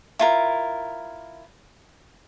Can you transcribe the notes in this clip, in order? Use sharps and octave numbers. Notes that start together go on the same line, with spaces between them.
E4 F4 A#4